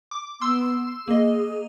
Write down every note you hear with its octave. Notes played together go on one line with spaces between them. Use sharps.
D6
B3 C6 E6
A#3 G#4 D#5